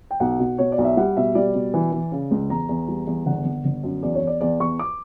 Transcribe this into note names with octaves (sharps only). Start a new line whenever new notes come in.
G5
B1 F#5
B2
B2 C#5
D5
B1
E5
G3 F#5
B2 E5
G3 D5
B2
E3
E3
C#3
C#2
E2 A#5
E2
G3
E2
G1 F#5
G1
G1
F#2
E2 D5
C#5
E2
D5
E2 D5
E2 C#6
D6